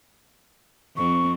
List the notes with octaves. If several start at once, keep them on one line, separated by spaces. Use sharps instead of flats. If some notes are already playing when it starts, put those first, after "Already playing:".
F2 C4 C#6